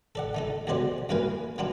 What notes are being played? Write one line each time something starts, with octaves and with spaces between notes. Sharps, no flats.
A4 D5 F#5
A3 D#4 A4
B1 F#2 G#3 F#4 C5 D5
F#2 E3 A#3 A#4 B4 G#5
E3 B3 D4 F4 F#4